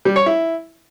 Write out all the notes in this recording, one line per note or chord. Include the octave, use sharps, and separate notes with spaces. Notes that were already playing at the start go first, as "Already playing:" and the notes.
G3
C#5
E4